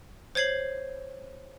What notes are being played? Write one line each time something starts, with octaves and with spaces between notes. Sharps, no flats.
C5 C#5 G#6 C7 F#7